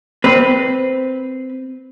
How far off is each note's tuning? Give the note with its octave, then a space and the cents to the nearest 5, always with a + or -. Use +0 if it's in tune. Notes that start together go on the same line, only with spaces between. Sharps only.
C4 -10 B4 +0